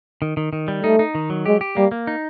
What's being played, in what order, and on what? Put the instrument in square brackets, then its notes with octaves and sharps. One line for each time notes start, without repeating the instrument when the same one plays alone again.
[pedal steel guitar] D#3
D#3
D#3
G3
[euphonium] A3 [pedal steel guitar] D#4
[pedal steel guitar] D#4
D#3
F#3
[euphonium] G#3 [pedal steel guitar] G4
[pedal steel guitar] G4
[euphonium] G3 [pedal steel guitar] A#3
[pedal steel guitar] A#3
D#4